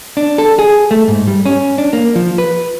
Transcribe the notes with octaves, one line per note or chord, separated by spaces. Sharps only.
D4
A4
G#4
A3
G#2
G3
C#4
D4
A#3
F3
B4